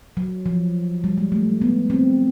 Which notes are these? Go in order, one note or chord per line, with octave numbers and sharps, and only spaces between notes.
F#3
F3
G3
G#3
A3
B3
C4